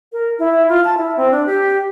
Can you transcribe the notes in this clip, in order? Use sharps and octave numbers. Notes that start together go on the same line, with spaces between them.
A#4
E4
F4
A5
E4
C4
D4
G4